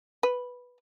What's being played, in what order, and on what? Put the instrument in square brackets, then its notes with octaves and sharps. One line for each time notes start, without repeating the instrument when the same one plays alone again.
[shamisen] B4